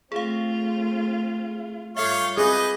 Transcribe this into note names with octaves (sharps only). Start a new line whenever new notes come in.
A3 C4 F4 G#4 F5
G2 F4 A4 C#5 E5 F5 G6
C4 G#4 B4 D#5 D6